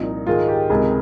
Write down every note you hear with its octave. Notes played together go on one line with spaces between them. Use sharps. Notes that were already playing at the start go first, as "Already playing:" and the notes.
Already playing: C2 A#2 F3 D#4
G#2 D#3 G#3 F4
G4
C#2 C3 D#3 G#4